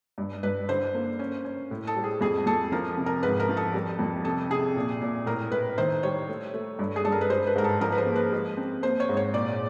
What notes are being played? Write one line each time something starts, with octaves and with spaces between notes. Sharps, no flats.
G2
G2 B4
D3 C5
A#3
C#4
C#4
A2
A4
G3
G#4
F2 G#4
F2 A4
F3 A#4
C3
A#4
G#2 B4
A#4
F3
A4
G3
F2
C3 A4
C3 G#4
A#2
A#2
A2 A#4
A2 B4
D#3 C5
G3 C#5
A3
A3
G2
G#4
G2 A4
A#4
B4
G#3 C5
B4
G#2 A#4
A4
F3 A#4
B4
C5
A#3
B4
G#3
C4
A#3 C5
C#5
G#2
C#5
A#2 D5